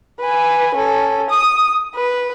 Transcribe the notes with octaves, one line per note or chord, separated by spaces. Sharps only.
B4 G#5
C#4 A4
D#6
B4